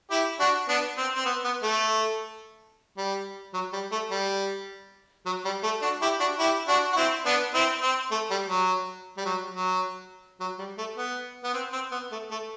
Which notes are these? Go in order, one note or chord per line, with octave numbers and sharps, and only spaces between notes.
E4 G4
D4 F#4
B3 D4
C4
C4
B3
B3
A3
G3
F#3
G3
A3
G3
F#3
G3
A3
D4 F#4
E4 G4
D4 F#4
E4 G4
D4 F#4
F#4
C4 E4
B3 D4
C4 E4
C4
A3
G3
F#3
G3
F#3
F#3
F#3
G3
A3
B3
B3
C4
C4
B3
A3
A3